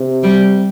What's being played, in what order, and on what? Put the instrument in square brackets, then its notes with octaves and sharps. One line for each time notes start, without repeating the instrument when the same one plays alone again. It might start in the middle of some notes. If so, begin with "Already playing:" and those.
Already playing: [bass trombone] C3
[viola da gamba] G3